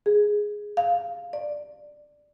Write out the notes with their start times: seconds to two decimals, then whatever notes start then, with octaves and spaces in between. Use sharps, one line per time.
0.06 G#4
0.77 F5
1.33 D5